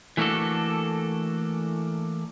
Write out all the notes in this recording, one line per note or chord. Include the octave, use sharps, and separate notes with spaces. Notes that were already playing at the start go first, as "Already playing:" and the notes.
E3 A3 A#3 D4 F#4 A4